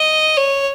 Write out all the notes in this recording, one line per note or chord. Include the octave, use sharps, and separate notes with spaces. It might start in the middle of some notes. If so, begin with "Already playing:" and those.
Already playing: D#5
C#5